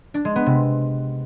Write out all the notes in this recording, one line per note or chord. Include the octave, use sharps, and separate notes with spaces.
D4
G#3
B3
C3